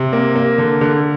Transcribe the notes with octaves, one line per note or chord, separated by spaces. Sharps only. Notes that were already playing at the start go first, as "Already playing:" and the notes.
Already playing: C3
A#3
A#3
D3
D3